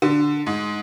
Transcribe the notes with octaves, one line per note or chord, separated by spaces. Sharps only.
D3
G#2